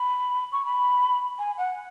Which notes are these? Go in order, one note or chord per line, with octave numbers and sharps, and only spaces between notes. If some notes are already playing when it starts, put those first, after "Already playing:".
Already playing: B5
C#6
B5
G#5
F#5